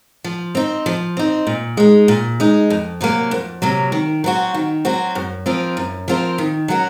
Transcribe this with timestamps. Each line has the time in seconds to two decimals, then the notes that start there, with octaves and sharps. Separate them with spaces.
0.24 F3
0.55 C4 D#4
0.86 F3
1.17 C4 D#4
1.47 A#2
1.77 G#3 D#4
2.08 A#2
2.40 G#3 D#4
2.70 F2
3.01 C3 F#3 A#3
3.31 F2
3.62 C3 F#3 A#3
3.92 D#3
4.24 F#3 C4 F#4
4.54 D#3
4.85 F#3 C4 F#4
5.15 F#2
5.46 F3 C4 F4 A#4
5.77 F#2
6.08 F3 C4 F4 A#4
6.38 D#3
6.68 F#3 C#4 F#4 A#4